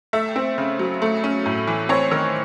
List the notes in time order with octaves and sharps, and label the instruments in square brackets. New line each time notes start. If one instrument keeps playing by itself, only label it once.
[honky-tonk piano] A3 E5
C4
C#3
F#3
A3
C#4
A2
E3
C4 C#5
D#3